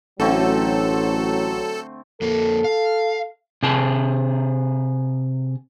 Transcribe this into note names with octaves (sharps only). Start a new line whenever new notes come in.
A1 D3 F#3 A3 C4 A4
F2 A#3 A4
F5
C3 G#4 A5